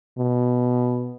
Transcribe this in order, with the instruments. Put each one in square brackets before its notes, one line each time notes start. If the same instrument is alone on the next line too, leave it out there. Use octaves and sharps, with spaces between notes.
[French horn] B2